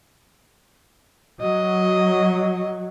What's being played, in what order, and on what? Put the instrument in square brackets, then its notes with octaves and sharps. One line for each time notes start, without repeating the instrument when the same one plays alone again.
[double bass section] F#3 [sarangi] D#5